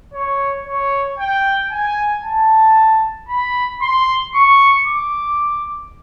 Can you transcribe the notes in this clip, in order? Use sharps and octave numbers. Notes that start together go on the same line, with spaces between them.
C#5
C#5
G5
G#5
A5
B5
C6
C#6
D6